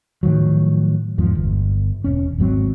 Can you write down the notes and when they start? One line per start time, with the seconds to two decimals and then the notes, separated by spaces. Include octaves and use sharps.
0.23 A2 D#3 F3 F#3
1.18 E2 G#2 F3
1.35 G1
2.04 E1 C#4
2.38 G#1 G#2 F#3 C4